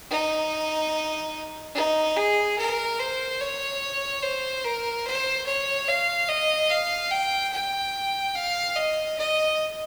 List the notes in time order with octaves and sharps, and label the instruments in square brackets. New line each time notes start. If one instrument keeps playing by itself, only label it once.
[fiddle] D#4
D#4
G#4
A#4
C5
C#5
C5
A#4
C5
C#5
F5
D#5
F5
G5
G5
F5
D#5
D#5